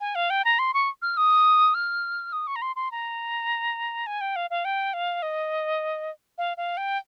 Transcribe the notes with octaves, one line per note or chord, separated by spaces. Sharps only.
G#5
F5
G5
A#5
C6
C#6
F6
D#6
F6
D#6
C#6
A#5
C6
C6
A#5
G#5
G5
F5
F5
G5
F5
D#5
F5
F5
G5